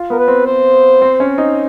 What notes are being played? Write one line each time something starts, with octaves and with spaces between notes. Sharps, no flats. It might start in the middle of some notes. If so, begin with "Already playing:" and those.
Already playing: F4
B3 A#4
B4
C4
C5
C4
C#4
D#4